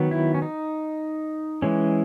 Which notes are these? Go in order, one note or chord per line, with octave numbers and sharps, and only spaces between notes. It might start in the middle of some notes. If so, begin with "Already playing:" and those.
Already playing: D#3 F#3 B3
E4
C#4
D#4
E3 G#3 C#4